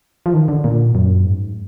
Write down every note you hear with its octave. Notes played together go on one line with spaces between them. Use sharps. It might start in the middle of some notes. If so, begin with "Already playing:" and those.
F3
D#3
D3
A#2
F#2
G#2